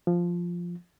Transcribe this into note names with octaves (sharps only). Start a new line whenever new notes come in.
F3